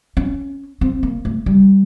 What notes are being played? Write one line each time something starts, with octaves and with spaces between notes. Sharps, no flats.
C#4
C4
A#3
A3
G3